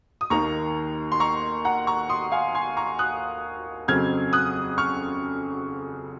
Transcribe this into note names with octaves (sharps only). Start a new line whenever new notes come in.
D#6
D#2 D#3 A#3 A#5 C#6
C6
A#5 C#6
F#5 A#5
A#5 C#6
C6 D#6
F5 G#5
G#5 C6
A#5 C#6
D#6 F#6
F2 C#3 F#3 C4 F6 G#6
D#6 F#6
C#6 F6